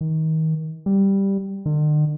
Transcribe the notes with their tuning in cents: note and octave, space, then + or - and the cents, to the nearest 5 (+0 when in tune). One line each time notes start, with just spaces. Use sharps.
D#3 +30
G3 +0
D3 +45